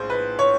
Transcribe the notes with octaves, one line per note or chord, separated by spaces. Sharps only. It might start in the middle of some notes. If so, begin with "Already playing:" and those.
Already playing: A#1 A2 G#4 C5
B4
C#5